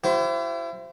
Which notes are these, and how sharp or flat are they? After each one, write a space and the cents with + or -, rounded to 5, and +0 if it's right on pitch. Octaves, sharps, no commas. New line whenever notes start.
E4 +35 G4 -40 C5 +0